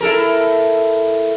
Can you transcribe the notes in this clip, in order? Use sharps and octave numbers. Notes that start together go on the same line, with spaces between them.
E4 A4 A#4